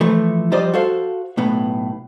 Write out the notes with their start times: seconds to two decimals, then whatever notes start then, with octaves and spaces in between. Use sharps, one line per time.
0.01 E3 F3 A3
0.52 F3 G3 C5 D5 D#5
0.74 F#4 A4 C5 F5
1.37 B1 A2 B3